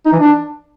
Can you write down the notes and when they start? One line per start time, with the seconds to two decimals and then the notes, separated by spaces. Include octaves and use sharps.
0.06 D#4
0.13 E3
0.20 D4